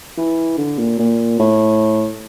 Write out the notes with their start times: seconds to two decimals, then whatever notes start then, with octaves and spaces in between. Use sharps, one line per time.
0.17 E3
0.58 D3
0.79 A#2
0.99 A#2
1.39 A2